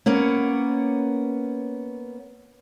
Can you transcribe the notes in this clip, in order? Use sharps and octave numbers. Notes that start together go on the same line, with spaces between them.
A#3 B3 C#4